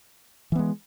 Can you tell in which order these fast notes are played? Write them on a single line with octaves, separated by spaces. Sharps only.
E3 B3 G#3